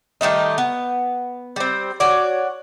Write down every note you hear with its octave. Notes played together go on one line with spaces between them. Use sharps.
D#3 G3 A3 D#4
B3
G3 C4
F#4 C#5 D5